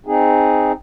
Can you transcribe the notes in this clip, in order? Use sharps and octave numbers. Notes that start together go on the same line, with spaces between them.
C4 D#4 G#4